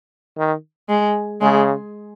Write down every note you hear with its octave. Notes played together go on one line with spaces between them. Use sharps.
D#3
G#3
C#3 G#3